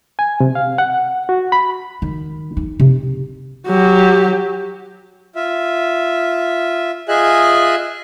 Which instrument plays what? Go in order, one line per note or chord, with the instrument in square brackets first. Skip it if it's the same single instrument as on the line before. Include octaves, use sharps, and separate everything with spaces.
[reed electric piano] G#5
C3
F5
F#5
F#4
B5
[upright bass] D#3
D#4
C3
[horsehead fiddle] F#3 G4
[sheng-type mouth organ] F4 E5
F4 G#4 D#5 E5 G#5 F#6